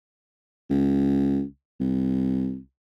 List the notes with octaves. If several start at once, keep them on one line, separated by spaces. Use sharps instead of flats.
C#2
C2